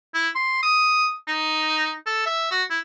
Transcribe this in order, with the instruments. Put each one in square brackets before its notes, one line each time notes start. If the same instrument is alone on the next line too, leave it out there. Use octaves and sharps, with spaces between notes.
[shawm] E4
C6
D#6
D#4
A4
E5
F#4
E4